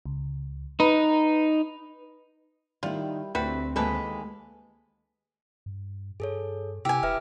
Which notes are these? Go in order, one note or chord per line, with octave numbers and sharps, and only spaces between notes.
C#2
D#4 B4
D#3 G3 E4 F4
D2 G3 C4 E4 F#4 B4
D#2 B2 E3 G#3 A4 B4
G2
G2 G#4 A4 C#5
C3 E4 G4 G#5 E6
E1 B4 E5 F6